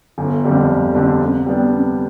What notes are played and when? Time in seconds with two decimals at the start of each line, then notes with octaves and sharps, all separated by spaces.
0.18 G1
0.45 F2 D3 G3 D4
0.69 G1
0.95 F2 D3 G3 D4
1.21 C3
1.46 G3 B3 D4
1.72 C3